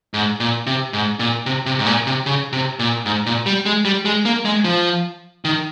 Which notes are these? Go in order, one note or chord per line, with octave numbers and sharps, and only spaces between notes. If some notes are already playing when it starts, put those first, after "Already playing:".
G#2
A#2
C3
G#2
A#2
C3
C3
G#2
A#2
C3
C#3
C3
A#2
G#2
A#2
G3
G#3
G3
G#3
A#3
G#3
F3
D#3